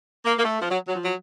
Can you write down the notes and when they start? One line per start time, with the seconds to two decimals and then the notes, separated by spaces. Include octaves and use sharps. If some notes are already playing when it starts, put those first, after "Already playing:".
0.25 A#3
0.37 A#3
0.43 A3
0.61 F3
0.69 F#3
0.87 F#3
0.96 F3
1.04 F#3